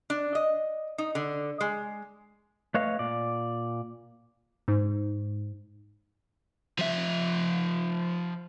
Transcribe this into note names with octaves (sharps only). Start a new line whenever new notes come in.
D4
D#5
D#4
D3
G#3
A3 B4 C#5 D#5 F5
A#2 D5
G#2
F3 E5